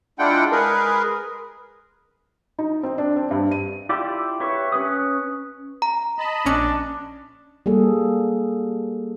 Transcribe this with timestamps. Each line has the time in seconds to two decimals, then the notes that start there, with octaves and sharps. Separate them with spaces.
0.19 G#3 D4 E4 F4 F#5 G5
0.52 G#3 G#4 A#4 B4
2.59 D#4
2.83 C4
2.98 D4
3.16 C4
3.31 G2
3.51 D#7
3.89 E4 F4 G4 D5
4.40 G4 B4 C#5 E5 C#6
4.72 C#4 B4 D#6
5.82 A#5
6.18 D#5 A5 B5
6.46 A#1 C#4 D4 C#7
7.66 G3 A#3 G#4 A4